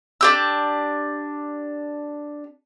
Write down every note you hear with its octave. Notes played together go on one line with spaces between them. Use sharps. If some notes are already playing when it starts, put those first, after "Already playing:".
D4 G4 E6